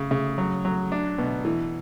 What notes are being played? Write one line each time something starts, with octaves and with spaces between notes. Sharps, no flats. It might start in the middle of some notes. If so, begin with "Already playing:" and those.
Already playing: C#3
C#3
F#3
F#3
D4
B2
E3